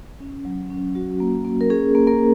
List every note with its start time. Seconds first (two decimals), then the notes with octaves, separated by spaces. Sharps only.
0.20 C#4
0.45 F#3
0.70 C#4
0.95 F#3 F#4
1.20 A#3
1.45 A#3
1.61 A#4
1.70 C#4 G#4
1.95 A#3
2.07 A#3 A#4